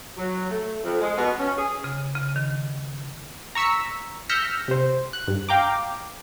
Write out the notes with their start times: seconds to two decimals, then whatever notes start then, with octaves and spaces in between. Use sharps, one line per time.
0.17 F#3
0.50 A3
0.84 F2
1.01 G#3
1.17 B2
1.39 C#4
1.57 G#4
1.84 C#3
2.15 C#3
2.36 D#3
3.55 A#5 C#6 E6 B6 C#7
4.29 E6 F6 G6 A#6 B6 C#7
4.68 C3 C5
5.13 F#6
5.28 G2
5.49 F5 G5 A#5 D6